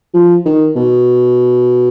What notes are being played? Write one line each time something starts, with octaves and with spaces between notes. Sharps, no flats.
F3
D#3
B2